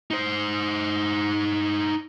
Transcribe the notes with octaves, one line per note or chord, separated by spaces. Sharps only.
D#4 C5